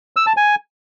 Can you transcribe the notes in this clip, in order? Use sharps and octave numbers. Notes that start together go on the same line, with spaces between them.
E6
A5
G#5